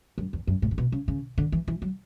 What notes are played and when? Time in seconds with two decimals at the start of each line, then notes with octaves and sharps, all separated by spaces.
0.18 F#2
0.33 E2
0.47 F#2
0.62 A2
0.71 C#3
0.78 B2
0.92 C#3
1.08 C#3
1.38 D3
1.52 E3
1.68 E3
1.82 F#3